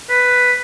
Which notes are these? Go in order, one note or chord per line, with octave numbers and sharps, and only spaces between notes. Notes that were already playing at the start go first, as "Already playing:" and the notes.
B4